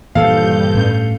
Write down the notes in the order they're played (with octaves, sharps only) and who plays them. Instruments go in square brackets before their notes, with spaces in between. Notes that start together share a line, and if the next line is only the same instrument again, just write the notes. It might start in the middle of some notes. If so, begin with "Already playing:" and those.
[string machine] G2 G6 [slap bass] A#2 E3 F3 [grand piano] A4 F5
[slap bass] A2 C#4